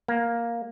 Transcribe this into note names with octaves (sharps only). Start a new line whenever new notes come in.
A#3